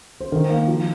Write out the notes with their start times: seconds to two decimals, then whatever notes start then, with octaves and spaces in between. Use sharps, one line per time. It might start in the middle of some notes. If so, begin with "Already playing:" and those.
0.20 C5
0.32 D#3 A#4
0.50 A#3
0.68 F3